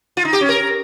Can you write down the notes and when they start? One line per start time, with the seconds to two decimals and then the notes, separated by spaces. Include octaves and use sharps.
0.17 F4
0.25 D#4
0.33 G4
0.41 C#4
0.49 A#4